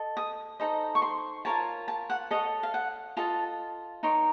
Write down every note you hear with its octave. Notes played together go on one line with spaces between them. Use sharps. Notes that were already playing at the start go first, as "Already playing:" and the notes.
Already playing: A4 D#5
D#6
D#4 A4 C5 D#5
C#6
C6
F4 A#4 C#5 A5
A5
F#5
A4 C#5 D#5
F5
F#5
F4 A4 D#5 A5
D#4 A#4 C#5 C6